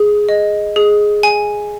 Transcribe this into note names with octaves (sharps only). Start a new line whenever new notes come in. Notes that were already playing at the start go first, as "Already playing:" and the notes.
Already playing: G#4
D#5
G#4
G#5